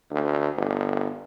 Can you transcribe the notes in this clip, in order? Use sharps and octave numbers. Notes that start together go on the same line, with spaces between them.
D2
G1